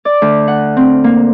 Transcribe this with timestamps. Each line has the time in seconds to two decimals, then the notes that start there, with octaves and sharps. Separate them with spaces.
0.05 D5
0.22 D2
0.48 F#5
0.77 C4
1.04 A#3